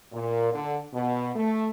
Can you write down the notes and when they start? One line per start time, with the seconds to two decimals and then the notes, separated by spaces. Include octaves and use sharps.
0.13 A#2
0.53 D3
0.94 B2
1.36 A3